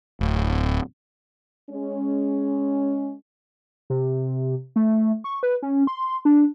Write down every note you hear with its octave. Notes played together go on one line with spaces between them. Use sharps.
D1
G#3 C#4
C3
A3
C#6
B4
C#4
C6
D4